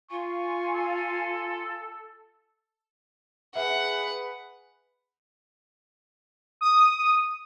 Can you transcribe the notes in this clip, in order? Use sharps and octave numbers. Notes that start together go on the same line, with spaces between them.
F4 F5 G#5 C#6
A4
G#4 B4 E5 F#5
D#6